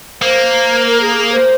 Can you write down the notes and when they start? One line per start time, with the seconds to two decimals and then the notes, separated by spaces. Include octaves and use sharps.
0.22 A#3 C5
0.85 A#4
1.01 G#4
1.17 G#4
1.32 C5